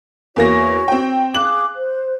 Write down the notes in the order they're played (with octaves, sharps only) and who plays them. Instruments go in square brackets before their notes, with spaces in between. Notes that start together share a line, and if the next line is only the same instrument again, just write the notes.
[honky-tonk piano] E2 A#3 A#6 [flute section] F#4 C#5
[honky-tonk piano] C4 G5
[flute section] G#4 F5 D6 [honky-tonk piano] F#6 F#7
[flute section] C5